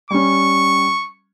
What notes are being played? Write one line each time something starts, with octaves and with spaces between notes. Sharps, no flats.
G3 C#4 C#6